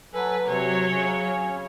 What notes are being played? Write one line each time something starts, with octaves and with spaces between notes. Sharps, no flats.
F#3 A4 B4 G#5
C3 F#3 C#5
C#3 C#4